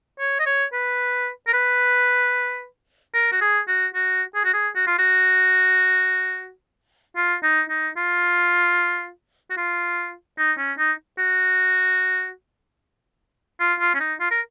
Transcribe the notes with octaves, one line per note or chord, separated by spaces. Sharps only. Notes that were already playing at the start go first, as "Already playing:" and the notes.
C#5
D#5
C#5
B4
A#4
B4
A#4
F#4
G#4
F#4
F#4
G#4
F#4
G#4
F#4
F4
F#4
F4
D#4
D#4
F4
F#4
F4
D#4
C#4
D#4
F#4
F4
F4
C#4
D#4
F4
A#4